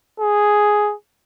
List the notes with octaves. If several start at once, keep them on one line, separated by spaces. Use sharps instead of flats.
G#4